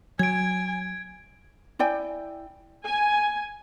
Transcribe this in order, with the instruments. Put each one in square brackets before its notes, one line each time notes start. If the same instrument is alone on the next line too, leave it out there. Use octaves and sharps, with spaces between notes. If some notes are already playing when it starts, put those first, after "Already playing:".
[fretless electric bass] F#3 [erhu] G#5 [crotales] G#6 D7
[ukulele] E4 D5 G5 G#5
[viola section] G#5